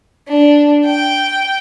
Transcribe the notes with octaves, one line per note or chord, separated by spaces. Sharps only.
D4
G5